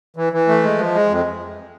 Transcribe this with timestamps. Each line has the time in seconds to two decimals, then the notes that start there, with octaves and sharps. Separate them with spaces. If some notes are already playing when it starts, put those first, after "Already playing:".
0.16 E3
0.33 E3
0.48 A3
0.64 G#3
0.78 F3
0.94 G#3
1.10 F2